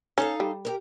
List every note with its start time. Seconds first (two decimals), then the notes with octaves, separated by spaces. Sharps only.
0.18 C#4 D#4 A4 F5
0.40 G3
0.65 G4 A4 A#4